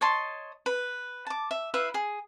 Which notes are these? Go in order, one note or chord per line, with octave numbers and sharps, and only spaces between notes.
C#5 D#5 A5 C6
B4
A5 D6
E5
E4 B4 E5 F5
G#4